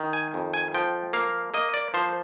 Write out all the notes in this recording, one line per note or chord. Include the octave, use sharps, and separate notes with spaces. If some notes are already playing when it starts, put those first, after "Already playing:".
Already playing: D#3
G#5
F2
G#5
F3 G5
A#3 F5
A#3 D#5
D5
F3 C5